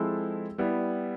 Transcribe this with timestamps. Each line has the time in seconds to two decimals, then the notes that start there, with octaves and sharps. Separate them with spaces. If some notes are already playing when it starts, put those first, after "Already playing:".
Already playing: F3 G#3 C4 E4 A4
0.58 G3 B3 E4